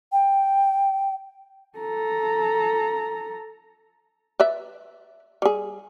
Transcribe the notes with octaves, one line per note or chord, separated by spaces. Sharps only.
G5
A4 A#5
B4 D5 E5
G3 G#4